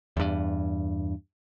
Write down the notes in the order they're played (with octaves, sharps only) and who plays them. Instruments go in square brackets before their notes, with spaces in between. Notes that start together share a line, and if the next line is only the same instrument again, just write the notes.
[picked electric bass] E2 G2